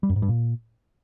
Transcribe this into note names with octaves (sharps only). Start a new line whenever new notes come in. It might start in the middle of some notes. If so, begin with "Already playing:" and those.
G3
F#2
G#2
G2
A#2